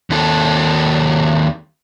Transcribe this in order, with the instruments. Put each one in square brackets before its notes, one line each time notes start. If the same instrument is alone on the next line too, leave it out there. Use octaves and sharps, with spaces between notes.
[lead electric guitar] D#2 A4